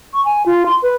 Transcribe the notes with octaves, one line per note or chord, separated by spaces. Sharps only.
C#6
G#5
F4
C6
B4